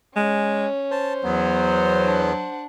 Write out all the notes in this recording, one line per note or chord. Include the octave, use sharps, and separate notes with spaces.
G#3 C#4
C5 A5
E2 F#3 B3
D4 F#5